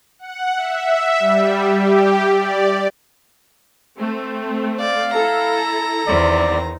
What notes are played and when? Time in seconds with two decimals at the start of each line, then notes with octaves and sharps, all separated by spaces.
0.19 F#5
0.57 E5
1.20 G3
1.67 G4
2.31 D5
3.99 A3 C4
4.80 D5 F5
5.14 E4 A4 A#5
6.07 E2 D#3 C4 D5